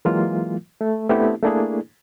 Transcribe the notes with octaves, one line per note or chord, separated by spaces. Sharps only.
E3 F#3 G#3 A#3 F4
A3
A3 B3 C4 D4 E4 G4
A3 A#3 D4 E4 G#4